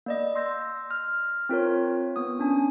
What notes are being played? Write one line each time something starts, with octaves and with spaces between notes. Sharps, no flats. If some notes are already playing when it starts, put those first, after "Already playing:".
A#3 D5 D#5
C6 E6 G6 A#6
F6
C4 F4 A#4 C#5
B3 D#6
C#4 D4 G#5